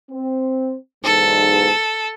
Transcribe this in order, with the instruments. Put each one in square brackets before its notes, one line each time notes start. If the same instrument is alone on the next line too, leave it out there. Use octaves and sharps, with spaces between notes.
[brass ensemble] C4
[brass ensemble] B1 E2 G#2 [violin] A4